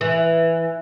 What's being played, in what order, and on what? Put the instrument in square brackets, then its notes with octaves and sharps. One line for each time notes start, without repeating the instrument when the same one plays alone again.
[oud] E3